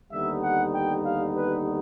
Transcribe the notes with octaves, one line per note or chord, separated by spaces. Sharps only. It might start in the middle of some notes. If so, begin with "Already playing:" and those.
D#2 D3 G3 B3 D#4 E5
F#5
G5
F5
B4